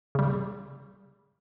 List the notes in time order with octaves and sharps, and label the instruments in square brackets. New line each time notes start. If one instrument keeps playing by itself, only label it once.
[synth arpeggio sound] C#3 G3